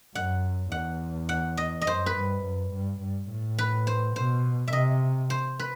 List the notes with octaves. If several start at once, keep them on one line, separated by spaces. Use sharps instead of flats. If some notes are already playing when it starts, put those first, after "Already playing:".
F#2 F#5
E2 F#5
F#5
D#5
D#5
F#2 C5
B4
G2
F#2
G2
G2
A2
B4
C5
B2 C5
E5
C3 D#5
C5
B4